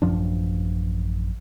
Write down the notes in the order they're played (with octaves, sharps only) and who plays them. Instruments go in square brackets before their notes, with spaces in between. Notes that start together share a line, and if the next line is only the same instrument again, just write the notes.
[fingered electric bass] A1 F#2 F3 D4